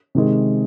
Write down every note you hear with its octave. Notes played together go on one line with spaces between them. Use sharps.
C3 D#3 G#3